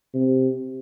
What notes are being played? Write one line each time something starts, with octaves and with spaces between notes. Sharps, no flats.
C3